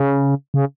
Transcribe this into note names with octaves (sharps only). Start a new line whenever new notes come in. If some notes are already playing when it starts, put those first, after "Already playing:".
Already playing: C#3
C#3